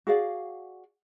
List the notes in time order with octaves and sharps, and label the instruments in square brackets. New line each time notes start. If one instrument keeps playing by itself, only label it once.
[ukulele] F#4 G#4 D5 F5